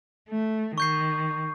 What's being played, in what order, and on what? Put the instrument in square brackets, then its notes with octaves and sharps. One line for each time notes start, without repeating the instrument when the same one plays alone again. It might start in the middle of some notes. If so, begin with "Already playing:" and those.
[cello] A3
[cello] D#3 [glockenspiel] C#6 G6 C7